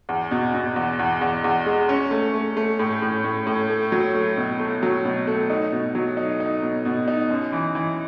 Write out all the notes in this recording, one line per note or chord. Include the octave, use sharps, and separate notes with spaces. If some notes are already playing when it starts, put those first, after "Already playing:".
E2
B2
B2
E2
E2
E2
E2
G#3
C#4
A3
A3
A3
A2
A2
A2
A2
A3
F#3
A3
B2
A3
F#3
B2
A3
D#4
B2
F#3
D#4
D#4
B2
B2
D#4
F#2
E3
E3